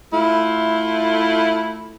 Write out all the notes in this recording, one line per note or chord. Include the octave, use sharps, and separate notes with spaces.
A3 E4 F4